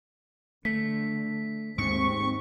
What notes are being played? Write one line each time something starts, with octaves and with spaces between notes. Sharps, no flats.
D3 A3 B6
D#2 G#2 G#3 C4 C#6